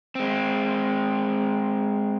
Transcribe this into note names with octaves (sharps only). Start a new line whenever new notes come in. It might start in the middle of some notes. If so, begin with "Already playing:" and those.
G#3 C4